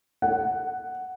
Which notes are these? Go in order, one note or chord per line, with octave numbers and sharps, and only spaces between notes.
F#5